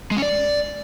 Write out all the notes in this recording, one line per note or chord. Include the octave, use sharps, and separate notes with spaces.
G#3
C#4
D5